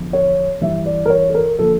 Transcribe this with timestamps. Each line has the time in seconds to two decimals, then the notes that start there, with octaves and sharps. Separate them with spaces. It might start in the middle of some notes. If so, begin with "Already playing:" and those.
Already playing: E2 D3 F3
0.13 C#5
0.61 G2 E3 G3 E5
0.86 D5
1.05 A#4
1.10 C#5
1.29 A4
1.34 A#4
1.58 D3 F3 A#3 A4